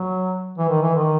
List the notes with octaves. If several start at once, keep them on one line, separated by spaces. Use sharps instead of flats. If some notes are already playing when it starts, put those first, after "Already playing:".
Already playing: F#3
E3
D#3
E3
D#3